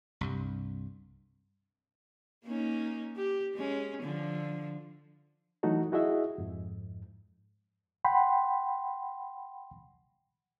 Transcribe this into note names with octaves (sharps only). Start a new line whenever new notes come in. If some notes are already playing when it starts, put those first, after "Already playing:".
C2 G2
A#3 C#4 D#4
G4
G#3 C#4
D3 F3
E3 F#3 A3 D#4 F#4 A4
E4 F#4 G#4 D#5 E5
F2 G#2
F#5 G5 B5 C6